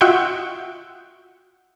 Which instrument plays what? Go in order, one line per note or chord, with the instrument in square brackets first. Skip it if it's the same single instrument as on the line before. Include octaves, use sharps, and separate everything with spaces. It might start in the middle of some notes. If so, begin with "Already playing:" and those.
[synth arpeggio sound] F4 F#4 D#5 E5 F#5 G5